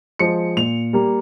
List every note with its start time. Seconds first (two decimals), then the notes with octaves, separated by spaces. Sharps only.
0.19 F3 G#3 C#7
0.57 A#2 F7
0.93 G3 A#3